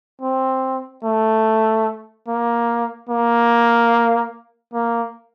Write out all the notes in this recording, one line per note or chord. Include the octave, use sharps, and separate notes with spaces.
C4
A3
A#3
A#3
A#3